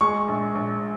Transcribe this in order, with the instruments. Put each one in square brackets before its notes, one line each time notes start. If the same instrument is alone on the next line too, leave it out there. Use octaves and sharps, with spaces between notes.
[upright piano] G#3 [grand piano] C#6
[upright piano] A#1
A#1